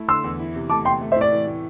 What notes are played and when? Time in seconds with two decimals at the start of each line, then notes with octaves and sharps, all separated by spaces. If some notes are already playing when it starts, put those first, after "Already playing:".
Already playing: A3 E4
0.08 D3 C6 E6
0.24 E2
0.39 E4
0.55 C3
0.70 A3 A5 D6
0.85 C3 G5 C6
1.01 A3
1.12 C5 E5
1.16 A2 D5
1.32 E3
1.47 A2